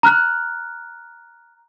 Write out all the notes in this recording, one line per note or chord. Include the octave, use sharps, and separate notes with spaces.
A#5 F6 F#6